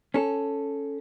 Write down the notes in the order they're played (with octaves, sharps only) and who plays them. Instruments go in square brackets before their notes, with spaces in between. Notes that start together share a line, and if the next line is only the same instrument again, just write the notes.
[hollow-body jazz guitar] C#4 A4